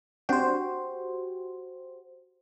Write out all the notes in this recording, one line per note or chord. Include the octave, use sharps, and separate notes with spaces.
C4 D4 F#4 G4 C5 G5